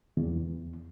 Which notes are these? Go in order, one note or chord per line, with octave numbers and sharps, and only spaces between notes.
E2